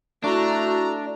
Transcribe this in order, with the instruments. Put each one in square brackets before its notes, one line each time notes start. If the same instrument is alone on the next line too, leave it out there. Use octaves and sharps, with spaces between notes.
[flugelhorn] A3 [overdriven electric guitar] D4 [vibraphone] E4 F#4 C#6 [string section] A#5